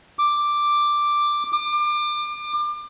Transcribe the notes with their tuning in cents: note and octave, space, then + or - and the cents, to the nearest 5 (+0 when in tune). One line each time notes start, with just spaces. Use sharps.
D6 +5
D6 +30